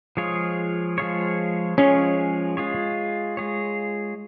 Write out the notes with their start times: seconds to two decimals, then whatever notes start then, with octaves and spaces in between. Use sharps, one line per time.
0.17 F3 G#3 F4 G#4 C#5
0.98 F3 G#3 F4 G#4 C#5
1.78 F3 G#3 C#4 F4 G#4 C#5
2.57 G#3 F4 G#4 C#5
3.37 G#3 F4 G#4 C#5